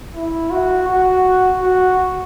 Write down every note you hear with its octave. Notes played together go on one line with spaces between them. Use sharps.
E4
F#4
F#4
F#4